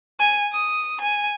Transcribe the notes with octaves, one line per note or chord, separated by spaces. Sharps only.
G#5
D#6
G#5